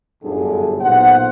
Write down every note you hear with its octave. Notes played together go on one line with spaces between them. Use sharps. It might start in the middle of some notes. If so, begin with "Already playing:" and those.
G1 F#2 A2 D3 G4 G#4
B1 A#2 C5 F#5